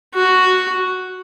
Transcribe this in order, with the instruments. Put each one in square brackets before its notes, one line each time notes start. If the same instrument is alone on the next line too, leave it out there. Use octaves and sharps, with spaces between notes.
[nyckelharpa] F#4